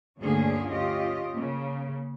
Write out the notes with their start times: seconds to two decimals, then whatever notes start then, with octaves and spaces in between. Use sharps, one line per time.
0.21 D2 G2 D3 A#3 C#4 G#4
0.70 C#4 F4 G4 D#5
1.36 C#3 A#3